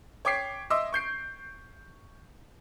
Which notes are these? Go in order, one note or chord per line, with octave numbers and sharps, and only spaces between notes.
C#5 G5 D6 B6 C7
D#5 E5 C6 D6 E6
C#6 G6 C7 D7